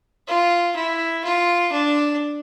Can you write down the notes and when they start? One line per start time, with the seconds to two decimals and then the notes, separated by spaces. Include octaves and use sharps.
0.28 F4
0.76 E4
1.25 F4
1.72 D4